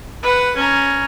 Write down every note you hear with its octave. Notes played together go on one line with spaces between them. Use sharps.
B4 F#5
C#4 A#5